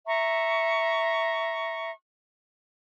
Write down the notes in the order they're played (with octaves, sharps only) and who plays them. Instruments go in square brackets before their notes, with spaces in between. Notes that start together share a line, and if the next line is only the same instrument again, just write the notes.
[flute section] E5 A#5 C#6